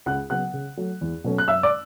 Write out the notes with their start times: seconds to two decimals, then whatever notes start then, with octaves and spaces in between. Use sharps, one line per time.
0.06 C#2 F#5 F#6
0.30 C#3 F#3 B3 F#5 F#6
0.53 C#3
0.77 F#3 A3
1.01 E2
1.24 B2 F#3 A3 C#4
1.38 F#6
1.48 F#2 E5 E6
1.63 D5 D6